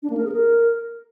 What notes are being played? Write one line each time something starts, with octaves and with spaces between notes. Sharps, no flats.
D4
A#3
A#4
G#4
A#4